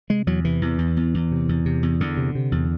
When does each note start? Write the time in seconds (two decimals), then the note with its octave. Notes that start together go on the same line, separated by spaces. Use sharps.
0.10 C3 G#3
0.27 E2 F#3
0.45 C3 E3
0.62 E2
0.78 E2
0.97 E2
1.14 E2
1.31 C3
1.49 E2
1.66 C3
1.83 E2
2.00 E2 D3
2.17 C3
2.35 C3
2.52 E2